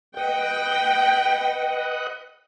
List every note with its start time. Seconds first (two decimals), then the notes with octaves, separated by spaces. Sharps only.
0.17 B4 D#5 F#5 G5